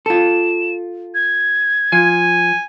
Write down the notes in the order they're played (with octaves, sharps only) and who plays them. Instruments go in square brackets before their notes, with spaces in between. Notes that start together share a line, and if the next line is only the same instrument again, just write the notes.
[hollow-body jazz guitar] F4 A4 [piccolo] E7
[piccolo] G#6
[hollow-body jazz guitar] F3 [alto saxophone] G#5